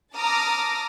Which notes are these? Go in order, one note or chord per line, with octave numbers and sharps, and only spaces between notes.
A5 A#5 D6 D#6 F6 A#6